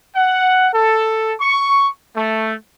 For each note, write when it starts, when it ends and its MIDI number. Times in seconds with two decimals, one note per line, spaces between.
0.15 0.69 78
0.73 1.33 69
1.40 1.88 85
2.16 2.54 57